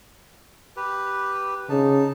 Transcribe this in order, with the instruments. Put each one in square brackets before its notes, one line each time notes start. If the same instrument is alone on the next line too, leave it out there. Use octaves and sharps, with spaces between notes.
[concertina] G4 B4
[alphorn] C#3 [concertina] D#4 A5